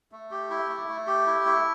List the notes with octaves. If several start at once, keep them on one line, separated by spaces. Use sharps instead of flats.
A3
G4
E4
A3
A3
G4
E4
A3